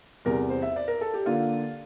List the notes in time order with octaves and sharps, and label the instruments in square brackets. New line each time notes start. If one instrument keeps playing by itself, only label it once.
[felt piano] E2 C3 G3 A#4
C5
E5
D5
A#4
A4
G4
D3 A#3 F4